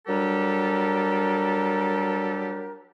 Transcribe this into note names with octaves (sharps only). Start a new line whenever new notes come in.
F#3 G3 D4 G4 A4 A#4